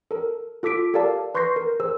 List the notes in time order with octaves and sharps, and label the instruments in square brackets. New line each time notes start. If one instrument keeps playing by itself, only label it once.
[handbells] A4 A#4
F4 A4 D6 B6 D7
G4 A4 A#4 D5 F5 A5
B4 C6 C#6 G6 A#6 C7
A#4
G#4 A#4 C5 E6